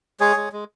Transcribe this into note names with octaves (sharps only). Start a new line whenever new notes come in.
G#3 G#4 C#5
G#3
G#3